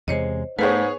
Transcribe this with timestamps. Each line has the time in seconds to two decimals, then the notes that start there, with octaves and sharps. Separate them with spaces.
0.08 E2 C3 G#3 C5 C#5 D#5
0.59 G#2 A3 B3 G#4 B4 C#5